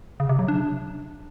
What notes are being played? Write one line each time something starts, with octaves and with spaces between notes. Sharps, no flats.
C#3
C3
F#3
D4